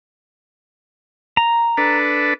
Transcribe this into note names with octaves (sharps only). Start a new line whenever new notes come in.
A#5
D4 A4 B4